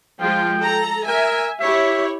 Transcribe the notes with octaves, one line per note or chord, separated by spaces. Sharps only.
F3 G#3 F4 G5
A4 A#5
A#4 E5 G#5
E4 G4 C#5 E5